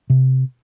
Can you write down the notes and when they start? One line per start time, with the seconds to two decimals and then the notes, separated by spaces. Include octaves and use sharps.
0.10 C3